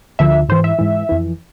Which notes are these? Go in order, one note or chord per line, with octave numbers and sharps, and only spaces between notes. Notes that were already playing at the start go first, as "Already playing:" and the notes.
D2 D3 F3 E5
G#2 E3 C5
E5
G#2 E3
F2 E3